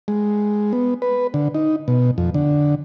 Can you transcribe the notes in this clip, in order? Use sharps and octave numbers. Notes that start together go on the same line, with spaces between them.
G#3
B3
B4
D3
D#4
B2
F2
D3